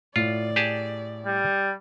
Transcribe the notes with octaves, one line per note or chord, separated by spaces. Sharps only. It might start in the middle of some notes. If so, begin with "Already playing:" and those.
A2 F4 D5
G4 G#4 A5
G3